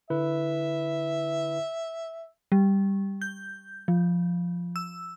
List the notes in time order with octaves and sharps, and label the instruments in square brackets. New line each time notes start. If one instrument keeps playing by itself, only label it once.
[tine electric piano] D3 E4 B4 [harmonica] E5
[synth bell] G3
G6
F3
E6